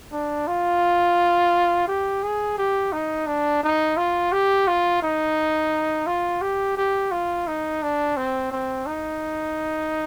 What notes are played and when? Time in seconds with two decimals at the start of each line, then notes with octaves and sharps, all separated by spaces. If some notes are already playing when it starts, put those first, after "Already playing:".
0.12 D4
0.47 F4
1.88 G4
2.22 G#4
2.58 G4
2.92 D#4
3.27 D4
3.63 D#4
3.97 F4
4.32 G4
4.67 F4
5.02 D#4
6.06 F4
6.41 G4
6.77 G4
7.12 F4
7.47 D#4
7.82 D4
8.17 C4
8.51 C4
8.86 D#4